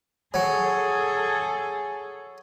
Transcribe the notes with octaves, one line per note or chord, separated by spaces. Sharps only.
F#3 G#4 A4 G#5